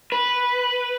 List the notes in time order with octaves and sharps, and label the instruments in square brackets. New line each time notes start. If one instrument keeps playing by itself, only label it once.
[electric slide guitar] B4